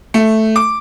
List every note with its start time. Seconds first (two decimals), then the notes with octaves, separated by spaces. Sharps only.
0.14 A3
0.56 D6